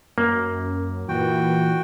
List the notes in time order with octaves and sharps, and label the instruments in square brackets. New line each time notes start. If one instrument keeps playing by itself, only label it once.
[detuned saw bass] F#2 [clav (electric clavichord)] A#3
[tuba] A#2 [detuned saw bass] E3 [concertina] F#4 G5